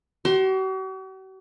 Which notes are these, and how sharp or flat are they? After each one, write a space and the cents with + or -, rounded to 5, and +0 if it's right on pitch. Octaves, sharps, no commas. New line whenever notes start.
F#4 +45 C6 +20